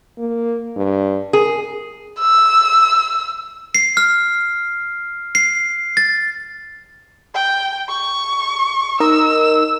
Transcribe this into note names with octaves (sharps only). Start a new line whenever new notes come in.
A#3
G2
G#4 A#4
E6
C7
F6
C7
A6
G5
C#6
D#4 A#4 D#5 E6